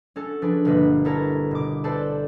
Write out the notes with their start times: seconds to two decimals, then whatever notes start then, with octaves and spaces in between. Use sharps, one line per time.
0.16 C#4 F#4 A4
0.42 F3 D4 G#4 B4
0.65 G1 B2 A#3 B4
1.05 E4 A4 A#4 C#5 A5 A#5
1.51 B2 D6
1.84 A4 B4 C5 D5 A5